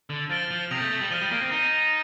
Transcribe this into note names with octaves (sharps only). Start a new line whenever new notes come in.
D3
F3 A6 D7 G7
F3
C3 D#6 G6 A#6 F7
A3
A3
G3
F3 F6 A6 D#7 G7
G3
A#3
C4
D#4 G6 A#6 D#7 G7